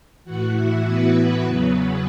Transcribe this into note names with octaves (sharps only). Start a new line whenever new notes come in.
A2 E3 F#4 F#5
E4 E5
B3 B4
E2 C#3 F#3